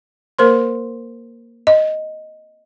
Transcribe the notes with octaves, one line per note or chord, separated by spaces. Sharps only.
A#3 A#4 C5 C6
D#5